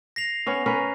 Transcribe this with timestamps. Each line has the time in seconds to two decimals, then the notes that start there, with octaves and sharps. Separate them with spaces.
0.16 A#6 C7 F7
0.47 B3 C#4 C#5
0.66 C#4 A#4 B4